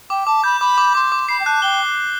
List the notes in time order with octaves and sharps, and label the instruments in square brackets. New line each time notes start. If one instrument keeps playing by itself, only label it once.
[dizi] G5 [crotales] D6
[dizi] A5 [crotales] D6
[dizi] B5 [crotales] G6
[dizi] B5 [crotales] D6
[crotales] D6
[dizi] C6 [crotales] D6
[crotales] D6
[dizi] B5 [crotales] C7
[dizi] G5
[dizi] A5 [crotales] F#6
[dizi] G5 [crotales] G7